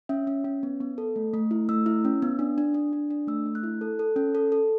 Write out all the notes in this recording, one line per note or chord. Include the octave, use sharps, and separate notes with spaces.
C#4 E5
C#4
C#4
B3
B3
A4
A3
A3
E4
A3 E6
E4
C#4
B3
D4
D4
D4
D4
D4
A3 E6
A3
F#6
E4
A4
A4
C#4
A4
A4